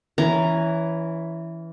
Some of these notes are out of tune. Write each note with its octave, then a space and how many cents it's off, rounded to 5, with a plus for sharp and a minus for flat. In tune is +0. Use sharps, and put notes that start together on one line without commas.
E3 +0 C#4 +15 A#5 +0